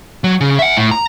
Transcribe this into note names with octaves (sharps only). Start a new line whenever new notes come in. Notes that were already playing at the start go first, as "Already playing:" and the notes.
F#3
C#3
E5 F#5
A2
A#5